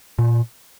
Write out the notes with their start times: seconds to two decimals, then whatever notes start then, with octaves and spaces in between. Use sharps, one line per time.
0.19 A#2